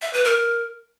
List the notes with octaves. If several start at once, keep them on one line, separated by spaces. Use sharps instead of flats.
E5
B4
A#4